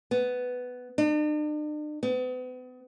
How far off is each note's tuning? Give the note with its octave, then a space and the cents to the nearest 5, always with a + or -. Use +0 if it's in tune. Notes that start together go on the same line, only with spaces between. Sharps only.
B3 +10
D4 +45
B3 +40